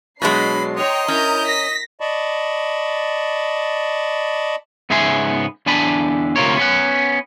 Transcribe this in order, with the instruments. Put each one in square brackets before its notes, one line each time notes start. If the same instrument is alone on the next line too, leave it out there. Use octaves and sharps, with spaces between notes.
[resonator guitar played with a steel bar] B2 F#3 G#3 [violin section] D4 C7 [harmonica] B5
[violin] C#5 [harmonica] D#5 [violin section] G5 A#5 C6
[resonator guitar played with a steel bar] C#4 [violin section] E4 A#5 [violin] A#4 G6
[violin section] A#6 [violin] B6
[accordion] D5 D#5 A5 B5 C#6
[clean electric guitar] G#2 C#3 B3 E5 G#5 C6
E2 D3 D4 G#5 A5 B5
D2 C3 F4 A#4 C#5
B3 C#4 F#5